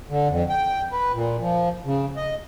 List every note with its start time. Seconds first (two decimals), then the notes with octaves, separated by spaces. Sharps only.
0.09 D3
0.29 F2
0.49 G5
0.92 B4
1.13 A#2
1.40 F3
1.85 C#3
2.17 D#5